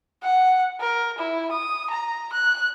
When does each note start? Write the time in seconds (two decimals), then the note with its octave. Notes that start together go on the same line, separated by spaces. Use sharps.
0.23 F#5
0.80 A#4
1.18 E4
1.51 D#6
1.90 A#5
2.33 F#6